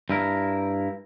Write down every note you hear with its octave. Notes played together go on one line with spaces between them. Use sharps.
G2 E4 A#4